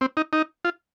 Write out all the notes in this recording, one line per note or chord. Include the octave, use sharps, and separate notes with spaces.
C4
D#4
D#4
F4